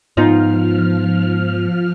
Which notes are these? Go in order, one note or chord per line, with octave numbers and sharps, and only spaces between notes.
G#2 F3 B3 D#4 F4 F6